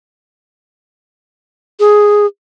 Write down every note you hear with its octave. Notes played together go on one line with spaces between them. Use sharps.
G#4